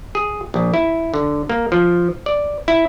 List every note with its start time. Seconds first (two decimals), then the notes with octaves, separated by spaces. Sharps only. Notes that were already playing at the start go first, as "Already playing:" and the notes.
0.15 G#4
0.54 A#1
0.74 E4
1.14 D3
1.49 A#3
1.72 F3
2.26 D5
2.68 E4